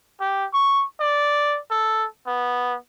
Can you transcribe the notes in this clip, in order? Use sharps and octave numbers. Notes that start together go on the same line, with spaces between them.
G4
C#6
D5
A4
B3